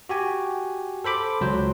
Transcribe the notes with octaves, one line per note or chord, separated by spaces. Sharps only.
F#4 G4 G#5
A4 C5 B5 D6
C#2 F#3 C5